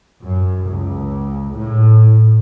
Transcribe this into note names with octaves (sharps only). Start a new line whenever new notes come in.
F#2
C#2
A2